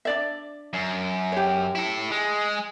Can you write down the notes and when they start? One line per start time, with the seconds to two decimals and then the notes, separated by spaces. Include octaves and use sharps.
0.05 D4 D5 E5
0.73 F#2
1.32 G4 C#5
1.75 E4 A4
2.11 G#3